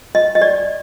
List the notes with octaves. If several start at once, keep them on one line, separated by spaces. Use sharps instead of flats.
D#5
D#5
D5